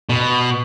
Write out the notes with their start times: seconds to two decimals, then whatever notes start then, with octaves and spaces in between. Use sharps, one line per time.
0.09 B2